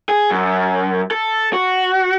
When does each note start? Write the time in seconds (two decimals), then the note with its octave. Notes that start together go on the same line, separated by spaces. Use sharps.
0.09 G#4
0.31 F#2
1.11 A4
1.53 F#4